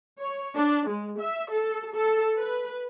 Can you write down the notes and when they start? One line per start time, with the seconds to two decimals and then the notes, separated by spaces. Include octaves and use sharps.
0.20 C#5
0.55 D4
0.89 G#3
1.19 E5
1.51 A4
1.94 A4
2.37 B4